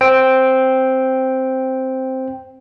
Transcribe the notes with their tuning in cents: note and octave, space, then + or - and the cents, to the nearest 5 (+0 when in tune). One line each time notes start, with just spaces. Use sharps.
C4 +0 G5 +0